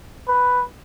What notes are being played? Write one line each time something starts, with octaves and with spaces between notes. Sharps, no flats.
B4